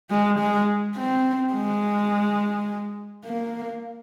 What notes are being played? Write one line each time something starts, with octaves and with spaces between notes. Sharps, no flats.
G#3
G#3
C4
G#3
A#3